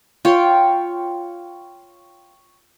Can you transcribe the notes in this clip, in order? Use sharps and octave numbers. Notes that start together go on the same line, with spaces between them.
F4 C#5 G5